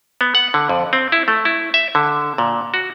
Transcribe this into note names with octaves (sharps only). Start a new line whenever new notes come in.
B3
F#5
D3
F2
C4
E4
A3
E4
E5
D3
A#2
F#4